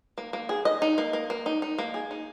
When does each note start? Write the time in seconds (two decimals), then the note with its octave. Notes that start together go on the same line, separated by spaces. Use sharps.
0.18 A#3
0.33 A#3
0.49 G#4
0.65 D#5
0.82 D#4
0.98 A#3
1.13 A#3
1.30 A#3
1.46 D#4
1.62 D#4
1.79 A#3
1.94 G#4
2.11 D#4